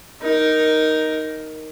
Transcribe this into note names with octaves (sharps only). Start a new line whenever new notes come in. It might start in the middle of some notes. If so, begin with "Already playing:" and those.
D#4 A#4